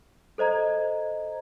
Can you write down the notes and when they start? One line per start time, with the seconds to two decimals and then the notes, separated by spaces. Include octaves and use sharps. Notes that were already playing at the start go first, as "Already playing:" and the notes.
0.38 A4 C5 D#5 A#5 G#6